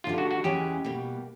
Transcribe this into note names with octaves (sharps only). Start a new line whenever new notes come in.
D2 D3 G3 F4
F#4
F#4
E2 C#3 E3 G#3 C#4 G4
B2 G3 A#3